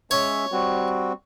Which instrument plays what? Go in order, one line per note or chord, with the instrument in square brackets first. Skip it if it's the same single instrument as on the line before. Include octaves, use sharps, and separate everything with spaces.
[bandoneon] G#3 C#4 E5 [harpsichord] C#5
[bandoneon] G3 C4 F#4